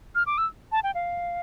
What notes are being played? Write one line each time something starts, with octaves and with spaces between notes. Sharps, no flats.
F6
D6
E6
A5
G5
F5